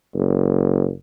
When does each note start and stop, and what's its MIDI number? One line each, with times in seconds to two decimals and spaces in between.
0.15 0.89 30